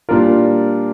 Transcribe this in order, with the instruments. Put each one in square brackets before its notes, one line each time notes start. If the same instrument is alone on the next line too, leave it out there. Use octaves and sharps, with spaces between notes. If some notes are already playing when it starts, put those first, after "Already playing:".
[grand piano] A#2 G3 D4 F4 A#4